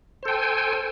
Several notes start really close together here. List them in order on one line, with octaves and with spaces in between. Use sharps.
C5 A4 G5 G#5